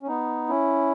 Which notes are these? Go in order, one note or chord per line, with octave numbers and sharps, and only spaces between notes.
C#4
B3 D#4
C#4 E4